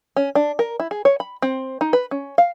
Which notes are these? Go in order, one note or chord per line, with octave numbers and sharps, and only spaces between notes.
C#4
D4
A#4
E4
G#4
C#5
B5
C4
D#4
B4
C#4
F5